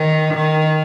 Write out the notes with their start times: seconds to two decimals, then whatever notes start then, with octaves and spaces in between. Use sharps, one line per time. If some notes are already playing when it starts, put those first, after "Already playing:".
Already playing: D#3
0.34 D#3